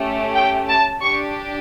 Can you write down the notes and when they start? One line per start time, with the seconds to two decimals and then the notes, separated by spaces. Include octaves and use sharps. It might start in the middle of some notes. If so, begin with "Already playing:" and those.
Already playing: A3 C#4 G4
0.35 G5
0.69 A5
1.02 D4 G4 C#6